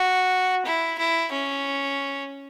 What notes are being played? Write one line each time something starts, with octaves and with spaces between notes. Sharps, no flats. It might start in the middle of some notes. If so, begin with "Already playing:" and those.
Already playing: F#4
E4
E4
C#4